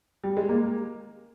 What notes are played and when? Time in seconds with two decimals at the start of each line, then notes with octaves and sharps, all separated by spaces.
0.24 G3
0.37 G#3
0.49 A#3